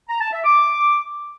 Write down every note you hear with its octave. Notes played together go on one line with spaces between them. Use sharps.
A#5
A5
E5
D6